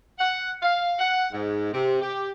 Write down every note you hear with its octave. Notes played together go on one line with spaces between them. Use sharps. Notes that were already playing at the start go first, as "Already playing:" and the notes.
F#5
F5
F#5
G#2
C3
G4